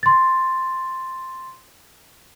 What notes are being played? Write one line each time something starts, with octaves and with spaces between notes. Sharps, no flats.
C6 A6